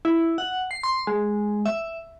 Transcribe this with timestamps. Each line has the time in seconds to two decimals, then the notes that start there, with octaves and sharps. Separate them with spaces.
0.05 E4
0.38 F#5
0.71 C7
0.83 C6
1.07 G#3
1.66 E5